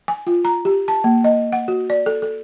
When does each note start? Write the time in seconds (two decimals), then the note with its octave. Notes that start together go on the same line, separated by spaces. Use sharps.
0.08 G#5
0.27 F4
0.45 A#5
0.65 G4
0.88 A5
1.04 A#3
1.24 D#5
1.52 F#5
1.68 F#4
1.90 D5
2.06 A4
2.22 A4